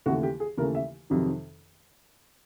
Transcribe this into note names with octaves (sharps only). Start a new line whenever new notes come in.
D#2 C#3 E3 A3 F#4
G4
G#4
D#2 C#3 E3 A3 A#4
E5
F2 C3 D#3 F#3